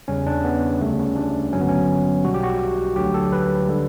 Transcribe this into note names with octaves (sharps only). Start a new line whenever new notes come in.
E2 C#3 G3 C#4
D4
B3
D2 C#3 G3 A3
C#4
D4
A1 G2 D3 F#3 C#4
B3
C#4
B1 B2 G3 F#4
G4
F#4
D2 D3 F#3 G4
A4
B4
D3 G3